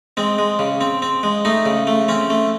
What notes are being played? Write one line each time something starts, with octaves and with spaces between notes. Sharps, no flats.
G#3 C4
G#3
C#3
C4
C4
G#3
A3 D#4
C#3
A3
C4 C#4
A3